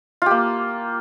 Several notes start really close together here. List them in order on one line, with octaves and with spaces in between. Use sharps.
F4 G4 A#3